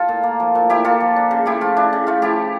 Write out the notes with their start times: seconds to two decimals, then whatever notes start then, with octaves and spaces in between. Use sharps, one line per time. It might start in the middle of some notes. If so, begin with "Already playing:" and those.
Already playing: F4 A4
0.08 A#2
0.23 A#3
0.40 F3
0.55 A#2
0.70 A#2 E4 G4
0.85 A#3 F4 A4
1.00 F3
1.16 D4
1.31 C#3
1.46 A3 E4 G4
1.61 F3 F4
1.77 D4 E4
1.93 C#3
2.07 A3 F4
2.22 F3 E4 G4